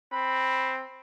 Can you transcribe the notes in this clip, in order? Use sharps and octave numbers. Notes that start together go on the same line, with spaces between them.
C4 B5